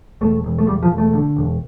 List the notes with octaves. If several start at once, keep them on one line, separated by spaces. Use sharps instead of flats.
E1 A3
E1
A3
E1 G3
F3
E1
A3
D3
E1